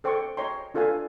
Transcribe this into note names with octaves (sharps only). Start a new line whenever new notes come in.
A4 C5 G5 C6 C#6
C#5 D#5 G5 A#5 C6
D4 F4 A4 B4 F5 G#5